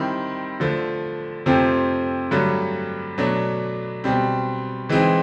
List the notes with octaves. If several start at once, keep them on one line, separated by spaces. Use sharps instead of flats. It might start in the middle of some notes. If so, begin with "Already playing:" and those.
Already playing: D#3 G3 C4 E4
D3 F3 A3
F2 C3 F3 A3 C4
G2 D3 F#3 A3
B2 F#3 A3 D4
B2 G3 C4
E3 G#3 C4 D#4